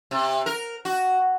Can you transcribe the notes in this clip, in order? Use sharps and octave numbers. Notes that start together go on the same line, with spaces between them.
C3
A#4
F#4